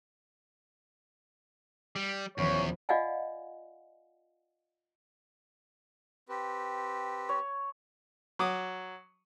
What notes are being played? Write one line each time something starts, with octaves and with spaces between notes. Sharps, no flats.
G3
D#1 E2 F3 C#5 B5
F4 D5 D#5 F5 F#5 G#5
C4 G4 B4
C#5
F#3 D6 D#6